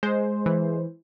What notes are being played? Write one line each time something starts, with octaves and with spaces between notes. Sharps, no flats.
G#3 C5
E3